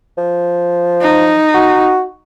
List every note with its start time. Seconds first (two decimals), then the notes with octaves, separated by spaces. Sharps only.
0.18 F3
1.01 D#4
1.54 F#4